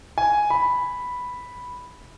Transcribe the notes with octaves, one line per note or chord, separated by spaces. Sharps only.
G#5
B5